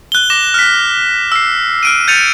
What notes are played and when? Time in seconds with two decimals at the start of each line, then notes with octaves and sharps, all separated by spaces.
0.12 F#6 G7
0.30 D6 A#6 E7
0.54 F6 B6
1.32 E6 C7
1.83 F6 D7 D#7
2.08 G6 A6 C#7 D#7 F7